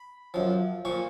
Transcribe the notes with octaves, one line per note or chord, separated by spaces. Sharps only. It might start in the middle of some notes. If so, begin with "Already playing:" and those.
Already playing: B5
F#2 F3
A#2 F3 C#6